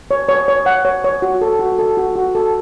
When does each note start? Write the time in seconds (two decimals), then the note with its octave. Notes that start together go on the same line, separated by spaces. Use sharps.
0.11 C#5
0.29 C#5
0.48 C#5
0.66 F#5
0.85 C#5
1.04 C#5
1.22 F#4
1.41 A4
1.59 F#4
1.79 A4
1.97 F#4
2.16 F#4
2.35 A4